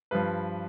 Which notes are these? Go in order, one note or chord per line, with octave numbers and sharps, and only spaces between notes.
G2 F3 B4